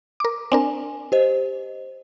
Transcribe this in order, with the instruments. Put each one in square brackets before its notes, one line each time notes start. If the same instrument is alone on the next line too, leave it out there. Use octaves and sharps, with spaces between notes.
[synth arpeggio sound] A#4 D6
[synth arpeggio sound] C4 D4 A#4 [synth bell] G#5
[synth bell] G4 C5 D#5